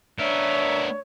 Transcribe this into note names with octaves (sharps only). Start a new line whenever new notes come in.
B3 D4 A#4 C#5 E5